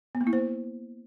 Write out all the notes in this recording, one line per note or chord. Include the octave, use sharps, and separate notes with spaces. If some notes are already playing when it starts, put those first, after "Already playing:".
B3
A#3
E4
C5